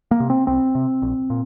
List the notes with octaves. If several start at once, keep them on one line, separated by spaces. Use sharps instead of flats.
A#3
C3
C4
C2 C4
C3
A#1
A#2